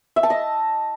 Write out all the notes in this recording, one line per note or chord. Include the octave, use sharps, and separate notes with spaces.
E5
A5
D#5